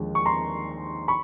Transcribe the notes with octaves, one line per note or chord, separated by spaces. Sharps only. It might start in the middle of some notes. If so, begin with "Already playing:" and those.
Already playing: D#2 D3 F3 G#3
C#6
A#5 C6
B5 C#6